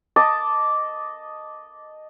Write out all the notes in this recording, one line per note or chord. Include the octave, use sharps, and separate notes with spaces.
D#5 A5 D6